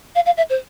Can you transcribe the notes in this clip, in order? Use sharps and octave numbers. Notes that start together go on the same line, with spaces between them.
F5
F5
E5
C5